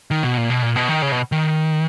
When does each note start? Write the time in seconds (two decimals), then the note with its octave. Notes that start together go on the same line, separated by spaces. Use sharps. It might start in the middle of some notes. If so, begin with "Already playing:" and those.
0.11 D#3
0.23 B2
0.37 A#2
0.50 B2
0.63 A#2
0.76 B2
0.89 D#3
1.02 C#3
1.12 B2
1.32 D#3